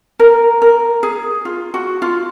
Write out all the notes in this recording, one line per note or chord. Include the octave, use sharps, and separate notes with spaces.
A#4
A#4
G#4
F4
F#4
F4